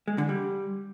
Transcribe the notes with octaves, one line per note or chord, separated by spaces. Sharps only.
G#3
D3
G3